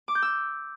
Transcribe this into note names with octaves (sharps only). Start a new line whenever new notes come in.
D6
G6
E6